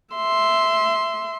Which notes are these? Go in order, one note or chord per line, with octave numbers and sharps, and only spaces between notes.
E5 C6